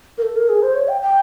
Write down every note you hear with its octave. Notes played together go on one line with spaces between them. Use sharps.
A#4
A4
A#4
G#4
C5
C#5
G5
G5